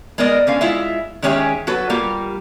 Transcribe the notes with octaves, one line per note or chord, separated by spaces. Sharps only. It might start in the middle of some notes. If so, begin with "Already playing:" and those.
G#3 B3 A#4 D5 D#5
D3 C#4 F5
G#3 E4 F4 E5
D#3 G#3 C#4 G4 G#4 E5
F#3 F#4 A4 B4
G3 A#3 F4